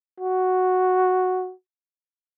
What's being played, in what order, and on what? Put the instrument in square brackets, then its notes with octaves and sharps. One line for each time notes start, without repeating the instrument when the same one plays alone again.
[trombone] F#4